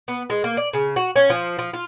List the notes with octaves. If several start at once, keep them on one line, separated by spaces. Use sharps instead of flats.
B3
G#3
A#3
D5
C#3
F#4
C#4
F3
F3
F4